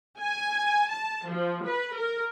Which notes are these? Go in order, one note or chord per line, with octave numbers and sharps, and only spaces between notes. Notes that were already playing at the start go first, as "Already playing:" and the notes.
G#5
A5
F3
B4
A#4